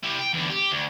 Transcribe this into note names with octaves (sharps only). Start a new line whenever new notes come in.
E4 G4
G5
E2 D3
G4
D2